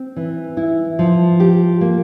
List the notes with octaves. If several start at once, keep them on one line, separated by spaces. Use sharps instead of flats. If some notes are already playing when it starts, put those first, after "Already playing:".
Already playing: C4
E3
E4
F3
G4
A#3